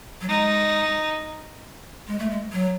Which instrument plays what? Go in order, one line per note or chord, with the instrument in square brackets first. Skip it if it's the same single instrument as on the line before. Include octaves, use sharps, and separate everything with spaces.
[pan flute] F#3
[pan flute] G#3 [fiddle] D#4
[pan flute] G#3
A3
G#3
F#3